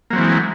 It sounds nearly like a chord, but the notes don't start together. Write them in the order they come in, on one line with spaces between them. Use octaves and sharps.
A#3 F#3 C4 E3 G#3